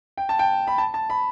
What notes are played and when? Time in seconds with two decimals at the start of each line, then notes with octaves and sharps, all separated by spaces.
0.17 G5
0.29 A5
0.39 G5
0.67 B5
0.78 A5
0.94 A5
1.10 B5